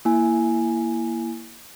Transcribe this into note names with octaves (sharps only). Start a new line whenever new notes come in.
A#3 E4 G#5